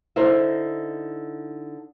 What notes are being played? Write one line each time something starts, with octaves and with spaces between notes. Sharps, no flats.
D3 D#4 E4 A#4 C5 E5